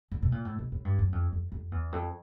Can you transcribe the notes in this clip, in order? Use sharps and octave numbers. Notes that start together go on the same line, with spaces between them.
D3
B2
A#2
A2
B2
A2
G2
F#2
F2
F2
F2
E2
F2